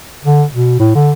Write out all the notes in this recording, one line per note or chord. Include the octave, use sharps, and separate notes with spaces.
D3
B2
A2
D3